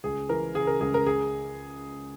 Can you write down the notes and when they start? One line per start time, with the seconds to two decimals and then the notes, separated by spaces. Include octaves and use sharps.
0.04 C#2 G#4
0.29 E3 A#4
0.54 C#3 G#4
0.67 A#4
0.80 C#2 G#4
0.94 A#4
1.07 G#4